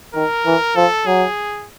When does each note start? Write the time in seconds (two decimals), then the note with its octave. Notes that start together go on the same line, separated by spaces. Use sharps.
0.15 D#3 A#4
0.46 E3
0.76 F3 A4
1.06 F#3 G#4